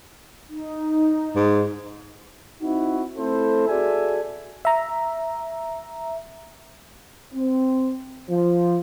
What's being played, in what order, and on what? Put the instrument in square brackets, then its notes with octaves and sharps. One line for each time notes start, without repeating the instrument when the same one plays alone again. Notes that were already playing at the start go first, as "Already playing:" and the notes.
[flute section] D#4
[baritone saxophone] G#2
[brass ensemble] C4 D#4 E4 F#4
A3 C4 E4 A4 C5
F#4 G#4 A4 D5 E5 G#5
[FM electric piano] E5 A#5
[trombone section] C4
F3